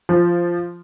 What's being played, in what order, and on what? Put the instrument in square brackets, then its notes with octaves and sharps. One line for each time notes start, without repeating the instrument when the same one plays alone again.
[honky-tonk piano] F3